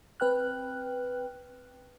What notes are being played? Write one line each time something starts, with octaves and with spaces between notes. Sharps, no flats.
C4 B4 G5 F6 F#6